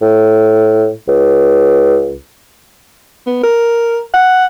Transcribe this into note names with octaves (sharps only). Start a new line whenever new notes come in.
A2
C#2
B3
A#4
F#5